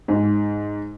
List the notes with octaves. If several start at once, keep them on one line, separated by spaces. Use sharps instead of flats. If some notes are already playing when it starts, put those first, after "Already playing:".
G#2